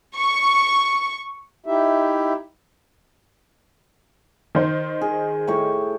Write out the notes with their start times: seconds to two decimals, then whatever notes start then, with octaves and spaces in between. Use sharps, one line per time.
0.16 C#6
1.66 D#4 E4 G4 E5
4.55 D#3 C5
5.01 G#4
5.47 A2 G4 C#6